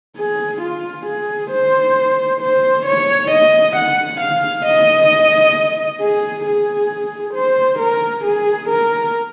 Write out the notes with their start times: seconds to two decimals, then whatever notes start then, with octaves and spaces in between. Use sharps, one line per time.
0.17 G#4
0.62 F4
1.06 G#4
1.52 C5
2.41 C5
2.86 C#5
3.31 D#5
3.77 F#5
4.21 F5
4.66 D#5
6.01 G#4
6.46 G#4
7.35 C5
7.80 A#4
8.25 G#4
8.69 A#4